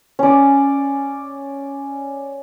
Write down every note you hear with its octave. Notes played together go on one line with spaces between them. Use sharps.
C#4 D5